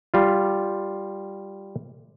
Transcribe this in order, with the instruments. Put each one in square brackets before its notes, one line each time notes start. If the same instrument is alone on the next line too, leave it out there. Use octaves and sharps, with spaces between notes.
[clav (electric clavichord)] G3 F4